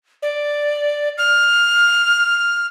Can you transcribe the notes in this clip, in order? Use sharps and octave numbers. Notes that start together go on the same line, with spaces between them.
D5
F6